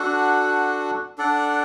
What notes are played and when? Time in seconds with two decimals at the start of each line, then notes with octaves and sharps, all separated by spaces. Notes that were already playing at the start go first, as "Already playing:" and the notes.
Already playing: D4 F#4 A4 F#5
1.18 D4 A4 D5 F#5